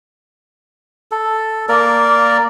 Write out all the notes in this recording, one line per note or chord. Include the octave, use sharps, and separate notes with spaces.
A4
A#3 A#4 D5